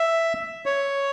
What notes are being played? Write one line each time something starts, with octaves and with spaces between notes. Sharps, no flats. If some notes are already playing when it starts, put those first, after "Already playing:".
Already playing: E5
C#5